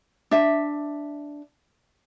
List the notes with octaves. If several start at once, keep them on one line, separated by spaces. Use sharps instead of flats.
D4 E5